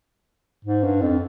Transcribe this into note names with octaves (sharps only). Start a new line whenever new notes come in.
G#2
G2
F2